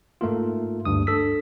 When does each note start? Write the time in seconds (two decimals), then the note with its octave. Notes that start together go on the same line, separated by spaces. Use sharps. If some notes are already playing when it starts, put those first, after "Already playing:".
0.21 G#2 A3 A#3 F4
0.85 D2 G2 D#6
1.07 D4 A4 E6 B6